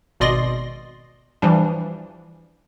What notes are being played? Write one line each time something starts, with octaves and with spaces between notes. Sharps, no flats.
G#1 B2 D5 D#5 C6 A#6
E3 F3 G3 D4